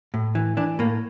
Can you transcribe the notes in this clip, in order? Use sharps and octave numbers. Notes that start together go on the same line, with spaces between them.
A2
E3
E3 D4
A2 A#3